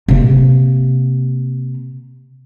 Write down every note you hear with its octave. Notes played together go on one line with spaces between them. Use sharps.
C3 A#3